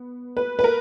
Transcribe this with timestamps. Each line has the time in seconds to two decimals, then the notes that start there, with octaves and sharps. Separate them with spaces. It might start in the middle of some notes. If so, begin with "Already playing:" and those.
Already playing: B3
0.37 B4
0.59 B4
0.64 A#4